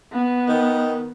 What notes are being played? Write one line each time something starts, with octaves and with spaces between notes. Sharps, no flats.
B3
D#3